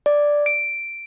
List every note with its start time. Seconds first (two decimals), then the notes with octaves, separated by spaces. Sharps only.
0.06 D5
0.46 D7